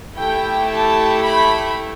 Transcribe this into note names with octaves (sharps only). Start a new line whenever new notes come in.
A3 E4 G4 G5
A5
B5